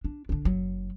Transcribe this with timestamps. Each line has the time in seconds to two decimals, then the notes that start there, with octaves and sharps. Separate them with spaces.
0.04 D4
0.29 D3 D4
0.45 F#1 F#3